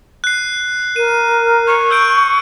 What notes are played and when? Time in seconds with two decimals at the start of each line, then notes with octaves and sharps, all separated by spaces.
0.24 F#6 C7
0.96 A#4 D#7
1.67 C#6
1.90 E6 G6 D7